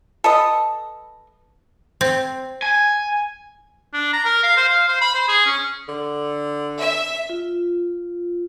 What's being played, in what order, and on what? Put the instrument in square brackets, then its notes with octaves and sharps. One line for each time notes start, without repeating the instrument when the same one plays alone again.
[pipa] A4 B4 D#5
[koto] C4
[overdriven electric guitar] G#5
[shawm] D4
A#5
A#4
F5
C5
F5
C5
B5
C5
G#4
C#4
[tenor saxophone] D3
[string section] E5
[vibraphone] F4